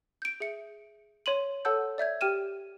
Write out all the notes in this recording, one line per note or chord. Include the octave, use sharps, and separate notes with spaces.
G6 D7
G#4 E5 C#7
C#5 C6 D#7 F#7
A4 C#5 F#5 A5 E6 G6
D5 E5 G6 G#6
G4 G5 F6 D#7 E7